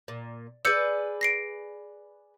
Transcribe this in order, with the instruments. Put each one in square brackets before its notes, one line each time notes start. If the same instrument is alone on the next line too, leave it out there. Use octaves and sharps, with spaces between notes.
[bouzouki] A#2
[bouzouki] G#4 B4 D5 [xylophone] E6 G6 C#7
[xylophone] A#6 C7 D7